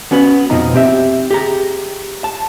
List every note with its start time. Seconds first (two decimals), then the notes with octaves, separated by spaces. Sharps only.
0.11 B3 C#4 F#4 B4
0.50 F2 B2 F3 D#4 A#5
0.74 C4 G4 E5
1.31 G4 G#4 A#5
2.24 A5